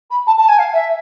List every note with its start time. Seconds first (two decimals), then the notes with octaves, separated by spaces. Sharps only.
0.10 B5
0.27 A5
0.37 A5
0.48 G#5
0.58 F5
0.73 E5